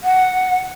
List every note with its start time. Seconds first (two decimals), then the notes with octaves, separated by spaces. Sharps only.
0.04 F#5